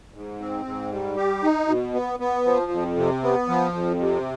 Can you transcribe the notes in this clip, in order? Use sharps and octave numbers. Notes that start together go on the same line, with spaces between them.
G#2
C4
G#2
G3
G4
D#4
B2
B3
B3
F3
F2
C3
B3
F3
F2
C3